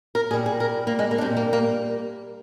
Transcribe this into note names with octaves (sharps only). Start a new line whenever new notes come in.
A#4
A#2 G3 G#4
G#4
A#4
A#3
G#3
A#3
D4
A#2 G3 C4
A#3
A#3